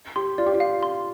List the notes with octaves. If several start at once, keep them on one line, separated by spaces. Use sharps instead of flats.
G4 C6
F4 D5
G4
F4
F5
C6